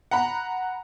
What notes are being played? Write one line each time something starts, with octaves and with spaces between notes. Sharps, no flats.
F#5 A#5 B5